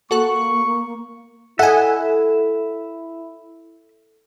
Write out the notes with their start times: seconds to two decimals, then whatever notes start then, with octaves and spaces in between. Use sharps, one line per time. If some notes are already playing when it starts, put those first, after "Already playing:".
0.11 A#3 F#4 A4 C#6 F#6
1.59 E4 A4 D#5 E5 F#5 G#5